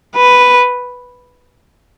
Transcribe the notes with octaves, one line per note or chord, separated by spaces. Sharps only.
B4